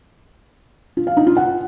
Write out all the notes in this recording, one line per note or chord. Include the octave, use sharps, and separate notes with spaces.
F4
F5
D#4
F4
F#5